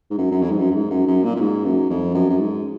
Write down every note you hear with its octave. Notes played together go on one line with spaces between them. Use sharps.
G#2
F#2
F#2
F2
G#2
F#2
F#2
G#2
F#2
F#2
A#2
A#2
G#2
F#2
F2
F#2
F#2
G#2